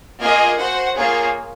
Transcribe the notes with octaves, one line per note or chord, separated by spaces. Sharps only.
A#3 F4 G#4 D#5 G#5
F#4 C5 F#5
A#3 F4 G#4 C#5